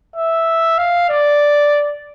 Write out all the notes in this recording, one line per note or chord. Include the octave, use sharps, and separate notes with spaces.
E5
F5
D5